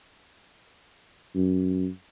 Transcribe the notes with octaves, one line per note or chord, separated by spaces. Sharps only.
F#2